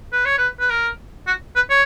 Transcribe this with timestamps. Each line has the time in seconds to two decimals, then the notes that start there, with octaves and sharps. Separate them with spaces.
0.13 B4
0.25 C#5
0.38 B4
0.60 B4
0.70 A#4
1.27 F#4
1.56 B4
1.70 C#5